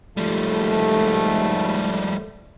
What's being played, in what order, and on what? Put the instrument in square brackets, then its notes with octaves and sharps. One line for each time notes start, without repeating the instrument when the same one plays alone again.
[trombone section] D#2 G#2 A3 [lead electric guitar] F3 G3